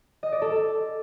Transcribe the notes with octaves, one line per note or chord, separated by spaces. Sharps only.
D#5
D5
A4